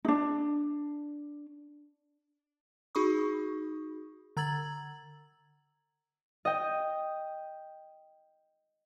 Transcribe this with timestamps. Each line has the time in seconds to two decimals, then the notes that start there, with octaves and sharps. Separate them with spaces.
0.05 D4 D#4
2.95 D#4 F#4 G#4 B5 C#6 D#6
4.37 D3 A#5 E6 G#6 A6 F#7
6.45 D#5 G5